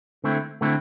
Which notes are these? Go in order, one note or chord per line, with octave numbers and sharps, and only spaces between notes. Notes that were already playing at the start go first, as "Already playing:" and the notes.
D3 A3 C4 E4
D3 A3 C4 E4